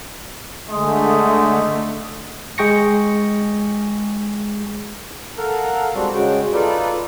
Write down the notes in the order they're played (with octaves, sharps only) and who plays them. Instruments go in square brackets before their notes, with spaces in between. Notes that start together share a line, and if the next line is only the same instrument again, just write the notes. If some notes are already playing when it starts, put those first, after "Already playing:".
[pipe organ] D3 A3 [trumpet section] G#3 D#5
[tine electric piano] G#3 G#4 G5 C#6 A#6 C#7
[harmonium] A4 A#4 F5 F#5
G3 G#3 C4 D4 F#4
C#3 G#3 F#4 G5
D#4 F4 A4 B4 D5